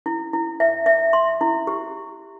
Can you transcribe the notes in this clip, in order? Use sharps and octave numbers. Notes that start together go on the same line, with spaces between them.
E4
E4
E5
E5
C6
E4
G4